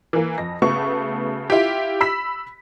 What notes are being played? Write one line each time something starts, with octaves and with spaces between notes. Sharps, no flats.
E3 A#3
F2 A#6
C#3 A3 B3 F#4 C#6
E4 F4 G4
B5 E6 B6